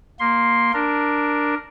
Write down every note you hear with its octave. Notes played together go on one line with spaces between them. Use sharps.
A#3 C6
D4 A#4